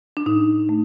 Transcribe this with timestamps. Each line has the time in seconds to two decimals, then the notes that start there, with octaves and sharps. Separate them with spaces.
0.17 D4
0.26 A2 D#4
0.69 A3